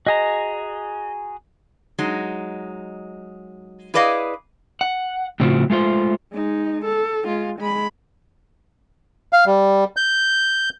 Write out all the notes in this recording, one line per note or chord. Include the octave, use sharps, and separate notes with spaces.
F#4 G#4 D#5 A#5
F#3 G#3 D#4
E4 G#4 B4 D5 D#5 F5
F#5
A2 C#3 F3 C4 F4 F#4
G#3 A3 F4 C5
G#3 D#4
A4
G#3 F4
G#3 B5
F5
G3
G6